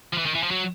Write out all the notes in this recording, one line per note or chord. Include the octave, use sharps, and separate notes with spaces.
F3
E3
D#3
E3
F3
F#3